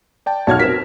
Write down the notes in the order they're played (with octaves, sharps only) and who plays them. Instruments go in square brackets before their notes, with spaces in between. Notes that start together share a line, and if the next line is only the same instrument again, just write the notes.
[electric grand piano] D5 G5 A5
[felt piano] B1 F#4 G#6 [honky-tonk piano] C#5 F6 [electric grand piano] A5
[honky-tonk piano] B2 C4 [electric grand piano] A#4 [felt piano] B6 E7